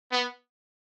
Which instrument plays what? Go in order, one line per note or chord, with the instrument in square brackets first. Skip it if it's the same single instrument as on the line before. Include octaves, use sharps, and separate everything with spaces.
[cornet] B3